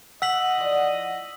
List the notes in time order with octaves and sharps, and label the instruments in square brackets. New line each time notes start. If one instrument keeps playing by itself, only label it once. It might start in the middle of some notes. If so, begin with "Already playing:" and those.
[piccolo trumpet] D#5 [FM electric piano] F#5 [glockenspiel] E6 B6 F#7
[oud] E3 F3 D5